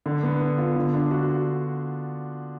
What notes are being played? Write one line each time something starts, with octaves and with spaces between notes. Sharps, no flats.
D3
B3
B3
F4
D3
D4
F#4